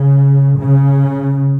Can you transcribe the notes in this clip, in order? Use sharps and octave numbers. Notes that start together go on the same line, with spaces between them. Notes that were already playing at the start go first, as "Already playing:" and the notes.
Already playing: C#3
C#3